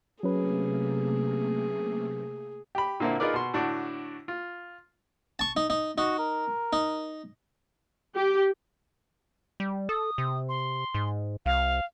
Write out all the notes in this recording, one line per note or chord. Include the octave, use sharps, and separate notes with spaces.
C3 F#3 A3 A#3 C#4 G#4 B4
G4 B5
A#2 D3 A#3 C4 E4
D#4 F4 G#4 A#4 B4 D5
B2 C6
A2 D3 D4 F#4
F4
A5 C#6
D#4
D#4
D#4 F#4
A#4
D#4
G4
G3
A4 D#6
C3
C6
G#2
C2 F5